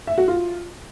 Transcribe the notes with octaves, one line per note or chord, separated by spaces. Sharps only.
E5
F#4
F4